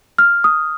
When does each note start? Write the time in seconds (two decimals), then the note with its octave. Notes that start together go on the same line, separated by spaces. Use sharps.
0.18 F6
0.44 D#6